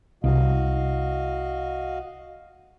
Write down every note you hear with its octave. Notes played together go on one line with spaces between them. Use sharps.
C2 F#4 D#5 F5